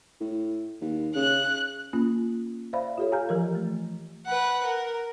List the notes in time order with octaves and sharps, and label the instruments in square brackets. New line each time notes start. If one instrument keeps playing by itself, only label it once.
[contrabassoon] A2
D#2
[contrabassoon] C#3 [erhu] F#6
[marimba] A#3 C#4 F4
C5 D5 E5 F5 B5
F4 G4 A4 C#5
G4 F5 G#5 A#5 F6 G6
E3 F3 G4 A#4
A3
[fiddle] B4 F#5
A#4